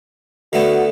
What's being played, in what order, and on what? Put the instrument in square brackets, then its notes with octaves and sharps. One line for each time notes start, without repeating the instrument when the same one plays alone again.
[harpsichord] D3 A3 B3 [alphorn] F#4